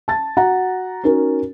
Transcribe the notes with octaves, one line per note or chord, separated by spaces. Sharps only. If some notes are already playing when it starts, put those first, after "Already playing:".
A5 A6
F#4 F#5 A#5
C#4 D#4 F#4 A#4